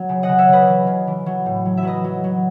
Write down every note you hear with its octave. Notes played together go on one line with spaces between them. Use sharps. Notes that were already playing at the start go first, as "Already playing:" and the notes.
Already playing: F#3
C#3
D#5 F#5
C#3
C#5 E5
C#3 B4 D#5
E3
C#3
E3
F#3
A2
F#3
E5
F#3 B4 D#5
F#3
F#3